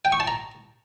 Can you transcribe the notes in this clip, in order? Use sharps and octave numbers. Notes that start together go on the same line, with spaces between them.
G5
C#6
A5
A#5